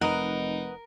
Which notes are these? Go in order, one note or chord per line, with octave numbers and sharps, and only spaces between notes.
F1 D#4 A#4 B4 D#5 F#5